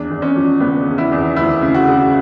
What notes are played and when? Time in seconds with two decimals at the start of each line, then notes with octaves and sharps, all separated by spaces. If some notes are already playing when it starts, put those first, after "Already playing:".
Already playing: E2 D4
0.10 E2
0.22 C#4
0.36 F3
0.60 C#3 B3
0.86 E2
0.98 E4
1.12 E2
1.36 D2 E4
1.61 C#3
1.74 F#4
1.87 C#3